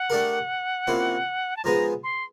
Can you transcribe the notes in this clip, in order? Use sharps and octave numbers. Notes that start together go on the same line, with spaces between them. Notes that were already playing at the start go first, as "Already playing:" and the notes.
Already playing: F#5
A3 D4 G4 A#4
C3 F3 A#3 C#4 E4
A5
F3 G#3 B3 D#4 G#4 A#5
C6